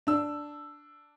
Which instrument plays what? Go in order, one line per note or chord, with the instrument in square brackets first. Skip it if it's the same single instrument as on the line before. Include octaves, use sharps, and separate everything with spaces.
[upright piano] D4 E6